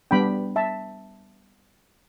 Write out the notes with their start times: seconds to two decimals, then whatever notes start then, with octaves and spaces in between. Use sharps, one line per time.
0.11 G3 B3 D4 G5 B5
0.56 E5 A5